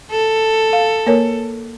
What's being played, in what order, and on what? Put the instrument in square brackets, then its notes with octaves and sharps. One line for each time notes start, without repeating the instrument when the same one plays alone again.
[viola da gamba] A4
[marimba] F5
A#3 A#4 C#5